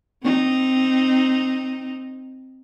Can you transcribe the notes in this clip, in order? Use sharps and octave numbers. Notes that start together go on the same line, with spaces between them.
C4 D#4